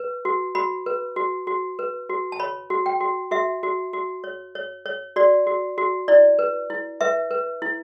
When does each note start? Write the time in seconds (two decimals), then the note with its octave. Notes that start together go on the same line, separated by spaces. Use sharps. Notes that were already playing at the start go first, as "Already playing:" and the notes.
Already playing: B4
0.25 F#4
0.55 F#4 B5
0.86 B4
1.16 F#4
1.47 F#4
1.79 B4
2.09 F#4
2.32 A5
2.40 C#5 B5
2.70 F#4
2.86 G5
3.01 F#4
3.31 F#4 E5
3.63 F#4
3.93 F#4
4.24 C#5
4.55 C#5
4.86 C#5
5.16 F#4 D5
5.47 F#4
5.78 F#4
6.08 E4 D5
6.39 B4
6.70 E4
7.01 B4 E5
7.31 B4
7.62 E4